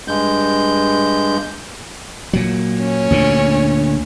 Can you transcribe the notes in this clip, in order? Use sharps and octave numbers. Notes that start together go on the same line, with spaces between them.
G2 G#3 G6
A#2 F#3
C#4
D2 A#2 D3